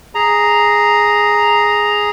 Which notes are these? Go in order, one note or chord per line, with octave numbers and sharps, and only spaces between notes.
G#4 A#5